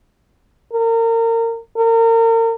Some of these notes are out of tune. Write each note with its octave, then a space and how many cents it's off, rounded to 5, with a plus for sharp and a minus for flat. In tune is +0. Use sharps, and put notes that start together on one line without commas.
A#4 -30
A#4 -35